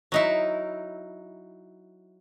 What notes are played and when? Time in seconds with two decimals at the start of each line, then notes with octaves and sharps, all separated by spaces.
0.12 F#3 D#4 E4